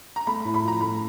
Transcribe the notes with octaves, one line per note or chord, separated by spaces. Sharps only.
A#5
A3 B5
B5
A2
B5
F3 A#5
A3 B5